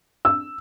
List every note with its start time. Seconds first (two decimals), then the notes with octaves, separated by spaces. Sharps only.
0.25 E6